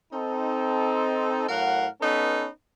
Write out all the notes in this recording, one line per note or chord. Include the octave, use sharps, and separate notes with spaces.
C4 D#4 A4
A2 F#3 A#4 F5 F#5
B3 C#4 D#4 A4 B4